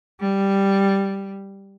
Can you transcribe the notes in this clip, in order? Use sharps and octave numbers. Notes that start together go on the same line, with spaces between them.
G3